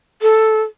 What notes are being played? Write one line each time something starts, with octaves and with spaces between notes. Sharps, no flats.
A4